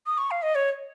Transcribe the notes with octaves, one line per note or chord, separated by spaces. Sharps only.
D#6
C#6
F5
D#5
C#5